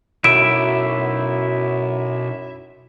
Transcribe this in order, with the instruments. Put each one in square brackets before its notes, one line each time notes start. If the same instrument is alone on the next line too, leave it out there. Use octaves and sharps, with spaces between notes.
[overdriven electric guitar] B1 [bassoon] F#2 [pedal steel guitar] E4 E5 [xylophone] D7